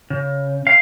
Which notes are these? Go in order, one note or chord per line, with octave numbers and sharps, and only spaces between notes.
C#3
F5